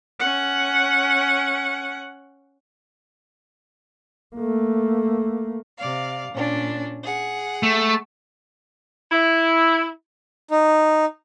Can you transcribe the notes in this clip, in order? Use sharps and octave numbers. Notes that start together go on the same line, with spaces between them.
C#4 F#5
A3 A#3
C3 D5 F5
A#2 C#4 D4
G#4 F#5
A3
E4
D#4